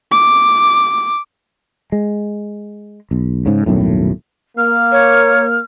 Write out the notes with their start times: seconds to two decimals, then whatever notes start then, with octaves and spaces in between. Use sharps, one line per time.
0.12 D6
1.92 G#3
3.11 B1
3.46 G#2 C#3
3.66 D#1 B1 F#2 A2
4.57 A#3 F6
4.92 C#5